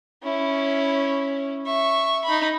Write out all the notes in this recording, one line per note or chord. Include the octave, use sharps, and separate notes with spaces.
C#4 E4
E5 C#6
D#4 B5